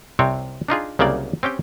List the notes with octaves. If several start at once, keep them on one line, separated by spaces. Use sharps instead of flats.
C2 C3 C4 C#5
D4 D#4 F4 G#4
C2 C#3 F#3 A#3 D5
C4 C#4 G4 G5